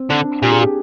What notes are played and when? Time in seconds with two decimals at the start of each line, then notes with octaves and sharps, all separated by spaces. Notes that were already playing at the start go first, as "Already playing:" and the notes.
Already playing: C4
0.10 D3 D4
0.43 A#2 G4
0.52 G#4
0.61 G4